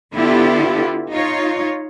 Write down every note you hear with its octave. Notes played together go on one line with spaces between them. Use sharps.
D3 B3 E4 F4 G4 A4
D#4 F4 C#5